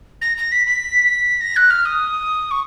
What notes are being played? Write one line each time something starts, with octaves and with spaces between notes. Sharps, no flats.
A#6
A#6
B6
B6
A#6
F#6
F6
D#6
C#6